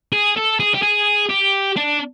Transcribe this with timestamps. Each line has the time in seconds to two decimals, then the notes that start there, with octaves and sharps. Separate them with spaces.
0.12 G#4
0.37 A4
0.60 G#4
0.74 G4
0.83 G#4
1.29 G4
1.76 D4